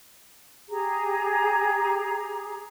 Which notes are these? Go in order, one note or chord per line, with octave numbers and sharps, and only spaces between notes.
G4 G#4 A#5